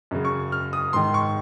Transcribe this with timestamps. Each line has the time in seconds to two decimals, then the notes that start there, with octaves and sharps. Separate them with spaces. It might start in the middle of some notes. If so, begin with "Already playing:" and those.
0.11 F#2 C#3
0.25 C#6
0.52 F6
0.73 D#6
0.93 G#2 D#3 C6
1.14 C#6